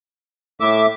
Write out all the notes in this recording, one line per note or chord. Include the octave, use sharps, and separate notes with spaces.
A2 E5 D6